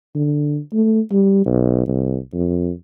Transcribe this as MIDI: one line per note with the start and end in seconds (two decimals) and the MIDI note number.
0.15 0.60 50
0.73 1.01 57
1.12 1.45 55
1.46 1.86 35
1.88 2.18 36
2.33 2.72 41